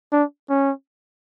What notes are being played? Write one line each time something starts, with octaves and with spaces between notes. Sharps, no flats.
D4
C#4